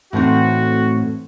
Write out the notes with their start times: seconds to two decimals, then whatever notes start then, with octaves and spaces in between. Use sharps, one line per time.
0.13 A2 E3 A3 C4 D#4 F#4